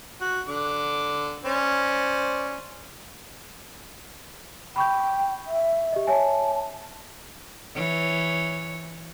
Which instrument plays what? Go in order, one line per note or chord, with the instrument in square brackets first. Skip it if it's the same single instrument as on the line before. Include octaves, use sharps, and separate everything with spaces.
[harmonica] F#4
D3 D6
C#4 C5 D5
[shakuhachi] G5 [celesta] B5 C#6 G6
[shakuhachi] E5
[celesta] G4 D#5
[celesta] C#5 E5 G#5 [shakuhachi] A5
[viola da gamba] E3 C#5